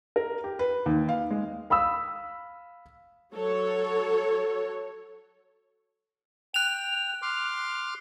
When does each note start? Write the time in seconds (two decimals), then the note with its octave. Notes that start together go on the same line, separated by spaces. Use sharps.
0.16 A#4
0.44 G4
0.59 B4
0.86 D#2
1.09 F5
1.31 G#3
1.70 F5 B5 D#6 E6
3.33 F#3 A4 C#5
6.54 G5 F#6 F7
7.22 C6 D6 F6